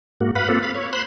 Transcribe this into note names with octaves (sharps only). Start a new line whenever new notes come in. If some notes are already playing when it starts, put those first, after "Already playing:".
G#2 A#3 F#4
B4 F5 F#5 B5
A#3 C4 F4 A4
F5 B5
C#5
C5 B5 C6 F#6